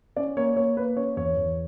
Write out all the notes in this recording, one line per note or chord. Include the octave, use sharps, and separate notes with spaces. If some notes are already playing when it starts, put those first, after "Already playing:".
C#4 D5
A#3 C#5
A#3 C#5
A#3 B4
C#4 C#5
E2 C#5
E2